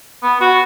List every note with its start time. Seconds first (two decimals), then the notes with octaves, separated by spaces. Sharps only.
0.23 B3
0.41 F#4